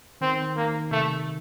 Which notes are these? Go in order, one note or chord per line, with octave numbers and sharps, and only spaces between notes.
D#3 C4
D#3 A#3
C3 A3